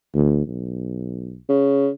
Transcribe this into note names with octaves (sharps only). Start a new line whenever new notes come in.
D2
B1
C#3